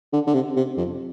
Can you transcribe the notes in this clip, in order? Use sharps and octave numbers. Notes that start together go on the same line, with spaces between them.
D3
D3
C3
C3
F2